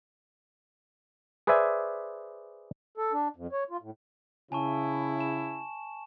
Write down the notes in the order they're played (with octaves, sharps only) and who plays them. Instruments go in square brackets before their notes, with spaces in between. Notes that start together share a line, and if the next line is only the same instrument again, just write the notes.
[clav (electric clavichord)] G#4 B4 C5 D5 E5 G#5
[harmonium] A4
D4
F2
C#5
F4
A2
[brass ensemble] C#3 E4 [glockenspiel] G#5 A5 C#6
[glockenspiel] E7